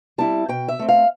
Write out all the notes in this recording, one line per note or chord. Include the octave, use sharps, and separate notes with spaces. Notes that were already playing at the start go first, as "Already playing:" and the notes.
G3 C4 E4 A5
B2 G5
E5
A3 C4
F5